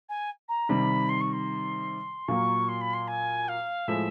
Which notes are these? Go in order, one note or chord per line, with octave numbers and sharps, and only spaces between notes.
G#5
A#5
C3 D#3 G3 B5
C6
C#6
C6
A#2 F#3 A#3 C#6
C6
B5
C6
G#5
F5
A2 F3 G#3 E5